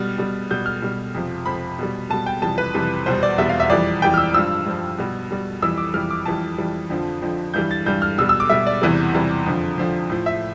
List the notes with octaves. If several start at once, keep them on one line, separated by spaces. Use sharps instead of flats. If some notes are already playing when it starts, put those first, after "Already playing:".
Already playing: B2 G3 F6
B2 G3
B2 G3 G6
F6
B2 G3
F2 C3 F3
F2 C3 F3 B5
B2 G3
B2 G3 A5
G5
F2 C3 E3 G3 A5
B4
F2 C3 E3 G3
E2 B2 G3 C5
D5
E2 B2 G3 E5
F5
E5
F2 E3 G3 D5
F2 E3 G3 G5
F6
E6
G2 F3 E6
G2 F3
B2 G3
B2 G3
F2 E3 G3 E6
D6
F2 E3 G3 F6
D6
F2 E3 G3 A5
F2 E3 G3
F2 D3 F3
F2 D3 F3
G2 E3 G3 G6
A6
G2 E3 G3 G6
F6
B2 G3 E6
E6
D6
B2 G3 E5
D5
E2 C3 E3 G3
E2 C3 E3 G3
F2 D3 F3
F2 D3 F3
A2 F3
E5